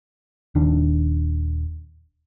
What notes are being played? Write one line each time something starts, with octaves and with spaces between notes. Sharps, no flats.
D#1 D#3 D4